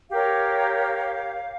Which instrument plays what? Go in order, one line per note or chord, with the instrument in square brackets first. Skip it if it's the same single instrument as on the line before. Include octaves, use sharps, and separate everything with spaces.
[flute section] G4 A#4 C#5 F5